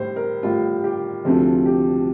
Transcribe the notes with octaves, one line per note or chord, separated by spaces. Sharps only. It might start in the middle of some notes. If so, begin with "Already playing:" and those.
Already playing: A2 G3 C5
A#4
A2 G3 F4
G4
D2 C3 F3 A4
G4